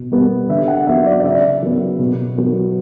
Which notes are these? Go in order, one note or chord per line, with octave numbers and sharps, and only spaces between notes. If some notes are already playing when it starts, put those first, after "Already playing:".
Already playing: B2
G3 B3
D3 E5
F#5
F#3 B3 E5
D5
D5
C#3 E5
F#3 B3
B2
F#3 B3